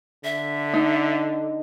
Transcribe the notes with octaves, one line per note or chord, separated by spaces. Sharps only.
D3 E5
D#4